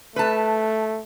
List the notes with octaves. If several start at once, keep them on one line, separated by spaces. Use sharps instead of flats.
A3 B4 A5